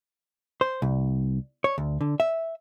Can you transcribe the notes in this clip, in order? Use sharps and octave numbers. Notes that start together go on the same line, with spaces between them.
C5
C2
C#5
D2
D3
E5